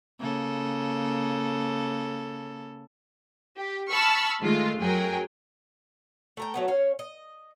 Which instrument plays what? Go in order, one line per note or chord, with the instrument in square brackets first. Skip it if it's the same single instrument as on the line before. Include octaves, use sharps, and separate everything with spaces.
[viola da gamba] C#3 A#3 A4
[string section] G4
A5 B5 C#6 E6 F6
D#3 G#3 A3 F4
F#2 F#3 G#4 A#4 G5
[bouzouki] A3 A#4 G5
F#3 A3 B3
C#4 C#5 F5
D#5